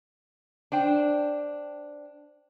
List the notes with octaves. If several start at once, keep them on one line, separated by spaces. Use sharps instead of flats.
D4 C5 G5